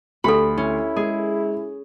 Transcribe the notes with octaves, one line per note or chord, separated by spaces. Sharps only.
D2 G4 A4 B5
C#4 E4
G#3 G#4